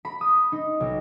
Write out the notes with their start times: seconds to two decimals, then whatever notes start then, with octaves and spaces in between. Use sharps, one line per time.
0.05 B5
0.21 D#6
0.52 D#4
0.80 B1